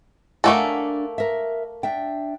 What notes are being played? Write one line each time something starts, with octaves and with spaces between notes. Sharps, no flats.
A3 A#3 D4 A4 F#5 G#5
A#4 E5
D4 E5 G5